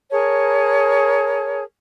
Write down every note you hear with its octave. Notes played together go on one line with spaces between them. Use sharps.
G#4 A#4 C#5 A5